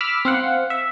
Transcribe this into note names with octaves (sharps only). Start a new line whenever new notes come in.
B5 D6 E6 F6
C4 F5 F#5
E5